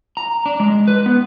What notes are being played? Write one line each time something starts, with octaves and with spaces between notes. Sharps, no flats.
A#5
D4
G#3
B4
B3